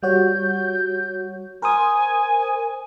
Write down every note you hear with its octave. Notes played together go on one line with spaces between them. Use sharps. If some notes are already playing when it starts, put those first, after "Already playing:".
G3 F#4 C#5 G6
A#4 C5 G#5 D#6